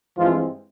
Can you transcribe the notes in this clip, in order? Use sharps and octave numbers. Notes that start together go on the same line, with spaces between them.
G2 E3 F3 G#3 C4 F4